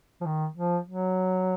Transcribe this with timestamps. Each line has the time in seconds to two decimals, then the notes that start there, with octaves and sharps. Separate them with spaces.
0.21 F3
0.26 D#3
0.56 F3
0.87 F#3